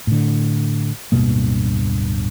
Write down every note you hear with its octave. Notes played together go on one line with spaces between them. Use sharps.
A2 D3
D1 G2 B2 A#3